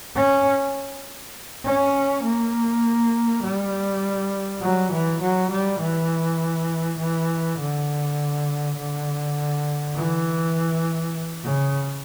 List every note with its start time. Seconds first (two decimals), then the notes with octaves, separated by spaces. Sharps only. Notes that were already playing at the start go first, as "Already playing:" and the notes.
0.15 C#4
1.64 C#4
2.23 A#3
3.43 G3
4.61 F#3
4.92 E3
5.21 F#3
5.51 G3
5.80 E3
6.99 E3
7.59 D3
8.77 D3
9.95 E3
11.44 C#3